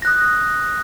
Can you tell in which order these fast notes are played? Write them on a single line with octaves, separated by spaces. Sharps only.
A#6 F#6 D#6